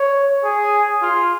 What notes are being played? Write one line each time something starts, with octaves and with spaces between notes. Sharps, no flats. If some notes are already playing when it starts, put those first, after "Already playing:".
Already playing: C#5
G#4
F4